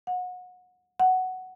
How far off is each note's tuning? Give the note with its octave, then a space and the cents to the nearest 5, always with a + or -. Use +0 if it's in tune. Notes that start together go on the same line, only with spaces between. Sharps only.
F#5 -30
F#5 +5